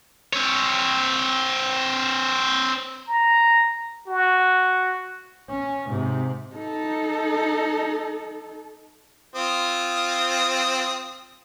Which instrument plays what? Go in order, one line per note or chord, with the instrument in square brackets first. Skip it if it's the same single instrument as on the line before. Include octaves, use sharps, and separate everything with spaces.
[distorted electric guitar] C4 C#5
[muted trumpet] A#5
F#4
[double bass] C#4
G#2 C3
[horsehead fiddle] D#4 A4
[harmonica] C4 F4 D#6